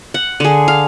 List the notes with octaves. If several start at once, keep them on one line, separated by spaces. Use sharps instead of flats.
F#5
D3 G#4
F5